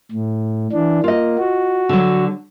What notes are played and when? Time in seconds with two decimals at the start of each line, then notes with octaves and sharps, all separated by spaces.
0.12 A2
0.72 E3 D4
1.04 A#3 F4 D#5
1.38 F#4
1.89 D3 F#3